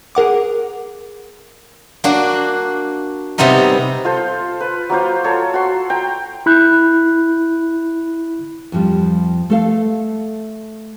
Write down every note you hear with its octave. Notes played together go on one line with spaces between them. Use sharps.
G#4 A#4 F#5 D6
A#3 D4 F#4
C3 G3 B3 D#4 A#4
F4 A4 C5
B4
F#3 A#3 F4 C5
A4 C#5 A#5
F#4 C6
G5 A#5
E4 B5 F#6 G6
F2 F3 G3
A3 A4 F5